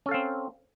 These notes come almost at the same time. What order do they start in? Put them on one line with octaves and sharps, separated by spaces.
C#4 A4 F5 C4